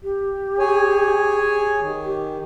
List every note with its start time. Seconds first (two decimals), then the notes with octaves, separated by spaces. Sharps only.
0.03 G4
0.59 G#4 C#5 G#5
1.81 D#3
2.05 G4